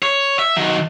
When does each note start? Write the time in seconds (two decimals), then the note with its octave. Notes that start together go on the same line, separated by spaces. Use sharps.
0.03 C#5
0.39 E5
0.56 D#3 F#3